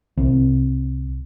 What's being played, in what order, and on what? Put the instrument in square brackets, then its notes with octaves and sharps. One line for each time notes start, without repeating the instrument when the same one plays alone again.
[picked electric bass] C2